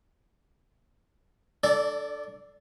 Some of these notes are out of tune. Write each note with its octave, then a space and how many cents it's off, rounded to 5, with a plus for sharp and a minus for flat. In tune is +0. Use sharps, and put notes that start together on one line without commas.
D4 +15 A4 +0 D5 -20